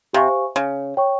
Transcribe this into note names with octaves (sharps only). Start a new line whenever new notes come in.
C3 G4 C5 F5 G#5 C#6
C#3
C#5 G5 C#6